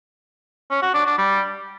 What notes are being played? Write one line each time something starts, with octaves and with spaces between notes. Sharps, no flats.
C#4
F#4
D4
D4
G3